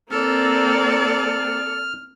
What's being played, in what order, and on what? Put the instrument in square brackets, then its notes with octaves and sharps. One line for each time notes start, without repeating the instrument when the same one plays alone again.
[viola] A#3 C4 [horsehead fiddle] A4 D5 [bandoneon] F6